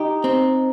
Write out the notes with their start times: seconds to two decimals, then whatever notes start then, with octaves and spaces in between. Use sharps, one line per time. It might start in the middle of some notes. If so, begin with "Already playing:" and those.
Already playing: D#4 G4
0.24 C4